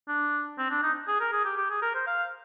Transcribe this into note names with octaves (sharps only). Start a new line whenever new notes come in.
D4
C4
D4
D#4
G#4
A#4
G#4
G4
G4
G#4
A#4
C5
F5